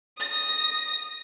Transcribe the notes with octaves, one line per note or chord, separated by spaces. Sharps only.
D#6 A#6